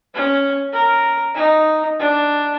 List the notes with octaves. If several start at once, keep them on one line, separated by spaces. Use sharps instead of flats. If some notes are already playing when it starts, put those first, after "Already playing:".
C#4
A#4
D#4
D4